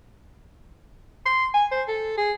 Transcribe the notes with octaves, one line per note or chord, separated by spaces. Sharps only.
C6
G#5
C5
A4
G#4